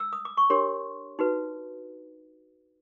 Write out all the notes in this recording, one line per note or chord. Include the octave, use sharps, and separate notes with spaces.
E6
D#6
D6
C#6
D4 G4 A#4 C#5 C6
D#4 F#4 B4